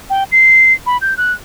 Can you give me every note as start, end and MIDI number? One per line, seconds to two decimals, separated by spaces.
0.10 0.24 79
0.32 0.73 96
0.86 0.97 83
1.01 1.16 91
1.17 1.33 90